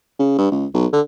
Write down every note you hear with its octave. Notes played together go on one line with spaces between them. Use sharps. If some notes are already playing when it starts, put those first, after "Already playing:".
C#3
G2
C#2
B1
D3